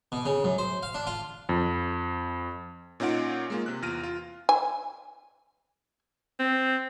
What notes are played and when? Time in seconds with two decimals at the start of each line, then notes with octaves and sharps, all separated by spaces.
0.12 B2
0.26 C#3
0.44 F#2
0.58 C5
0.83 F5
0.94 D4
1.07 F4
1.49 F2
3.00 A#2 C#4 D#4 F4 F#5 D7
3.50 G#3 A#3 F4
3.66 C3 F#6
3.82 E2 F4 F6 A#6 D7 D#7
4.04 F4
4.49 G#5
6.39 C4